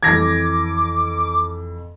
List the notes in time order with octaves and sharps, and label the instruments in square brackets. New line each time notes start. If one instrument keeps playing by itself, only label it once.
[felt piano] F2 E3 [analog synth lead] D6 [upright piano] G#6 A#6